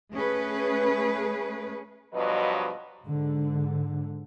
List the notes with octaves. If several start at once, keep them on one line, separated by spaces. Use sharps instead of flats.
A3 C#4 G#4 B4
G2 B2 F3 F#3 B4 D#5
G#2 D3